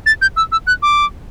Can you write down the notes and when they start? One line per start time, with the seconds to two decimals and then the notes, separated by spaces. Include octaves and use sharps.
0.06 A6
0.22 G6
0.36 E6
0.52 E6
0.67 F#6
0.82 D6